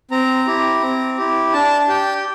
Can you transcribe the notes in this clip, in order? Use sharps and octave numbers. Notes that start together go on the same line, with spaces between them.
C4 A#5
E4 G4
C4
E4 G4
D4 A5
G4 G5